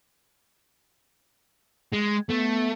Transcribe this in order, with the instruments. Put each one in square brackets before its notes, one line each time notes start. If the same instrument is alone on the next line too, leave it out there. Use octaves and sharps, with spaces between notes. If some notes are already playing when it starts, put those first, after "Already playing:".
[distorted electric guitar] G#3
[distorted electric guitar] A3 [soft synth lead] B3